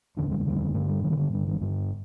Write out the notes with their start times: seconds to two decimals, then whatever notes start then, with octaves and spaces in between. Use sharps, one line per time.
0.17 F1 D#2 D3 D4
0.31 G3
0.40 A3
0.45 F1 D#2 D3 G3
0.74 G1 G2 D3 A3
0.89 G3
1.03 G1 G2 D3 D#3
1.17 D3
1.32 G1 G2 D3
1.47 D#3
1.61 G1 G2 D3